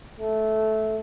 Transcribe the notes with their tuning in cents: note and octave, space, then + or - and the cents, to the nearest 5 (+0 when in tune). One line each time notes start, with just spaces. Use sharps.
A3 -10